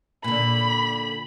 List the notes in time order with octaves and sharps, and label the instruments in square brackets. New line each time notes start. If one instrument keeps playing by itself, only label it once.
[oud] A#2 D3 [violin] B5